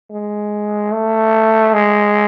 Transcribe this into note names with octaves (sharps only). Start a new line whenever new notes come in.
G#3
A3
G#3